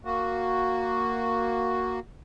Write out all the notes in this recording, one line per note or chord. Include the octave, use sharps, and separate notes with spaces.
A#3 F#4